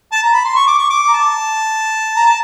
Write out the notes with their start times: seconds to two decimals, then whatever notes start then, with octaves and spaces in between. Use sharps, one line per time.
0.12 A5
0.23 A#5
0.33 B5
0.45 C6
0.56 C#6
0.67 D6
0.79 C#6
0.90 D6
1.08 A#5
1.13 A5
2.16 A#5
2.26 A5